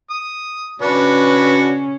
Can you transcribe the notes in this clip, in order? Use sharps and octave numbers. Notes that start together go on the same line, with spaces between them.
D#6
C#3 C#4 D4 F#4 B4